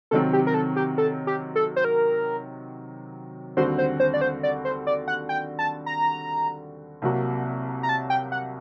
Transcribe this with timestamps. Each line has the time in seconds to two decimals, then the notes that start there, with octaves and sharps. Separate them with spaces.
0.11 C3 D#3 F#3 C4 A4
0.33 G4
0.47 A#4
0.54 A4
0.76 G4
0.98 A4
1.27 G4
1.56 A4
1.76 C5
1.85 A#4
3.57 D#2 D3 G3 C4 F#4 C5
3.78 C5
4.00 C5
4.14 D5
4.21 C5
4.43 D5
4.65 C5
4.87 D5
5.08 F#5
5.29 G5
5.59 A5
5.86 A#5
7.02 C2 C3 F#3 A#3 F#4
7.83 A#5
7.89 A5
8.10 G5
8.32 F#5